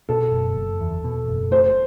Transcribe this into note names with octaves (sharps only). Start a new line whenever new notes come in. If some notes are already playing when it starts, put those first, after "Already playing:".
B2 A4
F#1
F#1
E2
B2
F#1
A3 C5